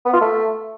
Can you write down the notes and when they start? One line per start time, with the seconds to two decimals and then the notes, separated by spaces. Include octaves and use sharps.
0.05 B3
0.13 F4
0.21 A3